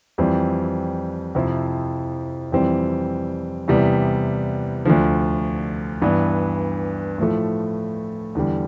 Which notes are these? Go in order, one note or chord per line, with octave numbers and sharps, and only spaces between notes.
F2 E3 G3 C4
F2 C3 F3 C4 E4
F2 E3 G3 C4
E2 C3 G3 B3
D2 D3 F3
G2 E3 B3 D4
A2 F3 A3
E2 D3 G3